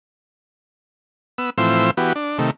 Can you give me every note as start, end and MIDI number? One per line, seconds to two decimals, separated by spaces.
1.38 1.50 59
1.38 1.50 88
1.58 1.91 45
1.58 1.91 52
1.58 1.91 53
1.58 1.91 60
1.58 1.91 72
1.58 1.91 88
1.97 2.13 52
1.97 2.13 59
1.97 2.13 66
1.97 2.13 67
2.15 2.38 62
2.38 2.51 48
2.38 2.51 51
2.38 2.51 57